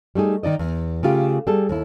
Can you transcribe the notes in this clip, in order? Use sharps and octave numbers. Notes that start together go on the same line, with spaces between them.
G3 A3 D#4 G#4
D#3 D#4 D5 D#5
E2
C#3 A3 F4 G4
G3 G#4 A4
D#2 E4